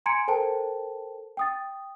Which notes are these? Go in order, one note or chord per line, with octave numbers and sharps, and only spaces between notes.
G#5 A#5 C6 G#6 C#7 D7
A4 A#4 C5 G5 A5
G5 D#6 A6